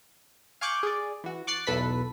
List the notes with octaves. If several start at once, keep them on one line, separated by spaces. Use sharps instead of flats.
F5 G#5 C#6 D6 F#6 G6
G#4 D5
E3 F#4
C#6 D6 F#6 A6 C7
B1 E2 A4 B4 B5 B6